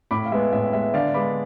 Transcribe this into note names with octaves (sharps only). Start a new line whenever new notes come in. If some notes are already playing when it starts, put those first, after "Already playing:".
A2 B5 D6
F5
G#3 B3 E5
A2 E5
G#3 B3 E5
D3 D5 F5
G#3 B3 B5 D6